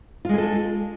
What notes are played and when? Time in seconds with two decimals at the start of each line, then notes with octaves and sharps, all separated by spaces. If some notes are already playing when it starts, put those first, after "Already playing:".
0.25 F4
0.29 G#3
0.34 G#4
0.38 A4
0.43 D4